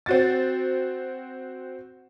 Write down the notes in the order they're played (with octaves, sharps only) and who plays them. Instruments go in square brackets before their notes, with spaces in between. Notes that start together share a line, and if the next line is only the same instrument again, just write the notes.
[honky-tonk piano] C4 F#4 A6